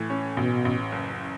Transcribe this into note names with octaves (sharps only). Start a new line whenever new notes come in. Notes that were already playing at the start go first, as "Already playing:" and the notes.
Already playing: A2 E3
C#4
A1 B2
A1
F#1